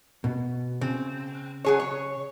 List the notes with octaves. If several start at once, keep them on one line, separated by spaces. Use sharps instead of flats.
B2
C#3 C4
F#3 G#4 C#5
C#5